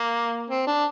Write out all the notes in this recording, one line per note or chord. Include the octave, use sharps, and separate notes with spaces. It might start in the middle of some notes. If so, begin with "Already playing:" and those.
Already playing: A#3
C4
D4